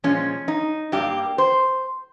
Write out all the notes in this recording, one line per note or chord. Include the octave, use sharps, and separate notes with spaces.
A#2 F3 G#3 C#4
D#4
G2 G3 A#3 G4
C5